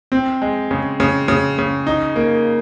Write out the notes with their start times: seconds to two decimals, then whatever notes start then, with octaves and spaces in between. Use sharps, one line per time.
0.12 C4
0.42 G#3
0.71 C#3
1.00 C#3
1.28 C#3
1.59 C#3
1.87 D#4
2.16 A#3